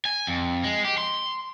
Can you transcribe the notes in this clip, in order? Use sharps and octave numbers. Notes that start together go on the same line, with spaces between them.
G#5
F2
G#3
G4
C6